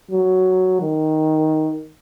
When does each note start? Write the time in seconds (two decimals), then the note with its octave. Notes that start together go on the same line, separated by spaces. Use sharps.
0.11 F#3
0.81 D#3